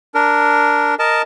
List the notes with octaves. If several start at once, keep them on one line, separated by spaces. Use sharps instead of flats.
D4 A#4
A#4 D#5 A5